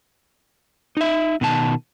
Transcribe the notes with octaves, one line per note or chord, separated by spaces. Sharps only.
D#4 E5
B2 D#3 A5